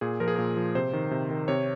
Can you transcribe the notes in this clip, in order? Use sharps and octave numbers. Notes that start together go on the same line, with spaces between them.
A#2 G#4
F3 A#4
G#4
A#2 A#4
F3
C3 C5
D#3
C3
D#3
C3 C#5